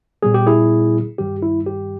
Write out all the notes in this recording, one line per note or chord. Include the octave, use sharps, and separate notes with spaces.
A#2 G3 B3 G#4
G4
E4 G#4
G2 D#3 G3 G4
E4
G4